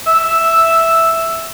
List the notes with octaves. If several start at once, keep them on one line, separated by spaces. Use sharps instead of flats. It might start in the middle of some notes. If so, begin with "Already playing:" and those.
E5